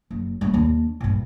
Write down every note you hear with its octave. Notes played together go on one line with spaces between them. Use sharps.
F#1
G3 A#3
D#2 D4
G2 A#2